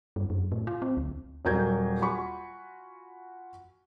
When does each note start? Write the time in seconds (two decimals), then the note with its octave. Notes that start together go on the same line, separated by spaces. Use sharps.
0.16 G2
0.30 F#2
0.52 A2
0.67 F4
0.82 C4
0.97 D2
1.45 D#1 F#3 A#4 G6 G#6
2.01 F4 F#4 G#5 B5 C#6